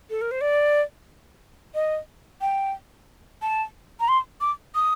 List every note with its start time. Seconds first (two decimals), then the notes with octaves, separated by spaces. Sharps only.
0.10 A4
0.21 A#4
0.31 C5
0.41 D5
1.75 D#5
2.41 G5
3.42 A5
4.00 A#5
4.08 C6
4.41 D6
4.75 D#6